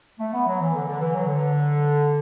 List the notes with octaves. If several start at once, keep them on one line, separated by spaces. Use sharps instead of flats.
A3
B3
F#3
E3
D3
D3
E3
F#3
D3